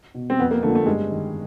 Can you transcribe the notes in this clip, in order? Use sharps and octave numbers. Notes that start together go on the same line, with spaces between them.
B2
C4
F2 B3
A#3
D3 F3 A3
A3
G2 G#3
D#3